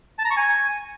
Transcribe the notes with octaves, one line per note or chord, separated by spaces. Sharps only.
A5
A#5
C#6
G#5